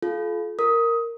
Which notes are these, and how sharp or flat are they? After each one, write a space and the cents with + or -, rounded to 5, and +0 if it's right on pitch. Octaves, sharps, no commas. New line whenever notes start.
F4 +0 A4 -40
A#4 -10 D#6 +15